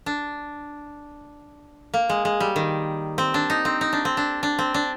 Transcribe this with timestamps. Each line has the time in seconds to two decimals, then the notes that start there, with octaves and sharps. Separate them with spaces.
0.06 D4
1.94 A#3
2.09 G#3
2.25 G#3
2.40 G3
2.56 D#3
3.18 C4
3.34 D4
3.50 D#4
3.65 C4
3.81 D#4
3.93 D4
4.05 C4
4.17 D4
4.43 D4
4.59 C4
4.74 D4